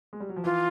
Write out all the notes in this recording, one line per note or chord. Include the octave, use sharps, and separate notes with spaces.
G#3
G3
F#3
F3
E3 F4